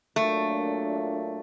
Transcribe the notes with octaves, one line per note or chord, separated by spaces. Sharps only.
A#2 F#3 A3 A#3 D4 F4